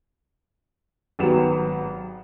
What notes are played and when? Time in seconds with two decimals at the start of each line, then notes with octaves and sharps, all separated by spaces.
1.19 G#1 F#3 B3 G4 E7